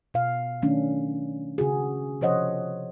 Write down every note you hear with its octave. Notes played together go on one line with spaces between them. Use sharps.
B2 F5
D#3 F#3 A3 C#4 D4
C#3 F#4 G#4
C3 F3 C5 C#5 D#5 F#5